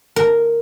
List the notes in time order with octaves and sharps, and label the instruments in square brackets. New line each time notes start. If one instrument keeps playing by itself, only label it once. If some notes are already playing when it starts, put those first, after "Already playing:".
[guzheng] A#4